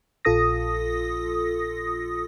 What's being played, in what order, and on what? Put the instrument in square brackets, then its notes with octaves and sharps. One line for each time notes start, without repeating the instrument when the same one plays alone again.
[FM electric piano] A#1 F4 A4 D#6 A#6